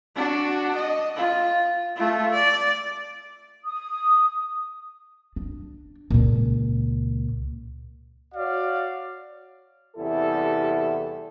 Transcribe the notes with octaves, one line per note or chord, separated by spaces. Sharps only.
D4 F#4
D#5
F4
A3 F4
D5
D#6
D4
C#2 A#2
F#4 C#5 D5 F5
E2 C3 G3 E4 A4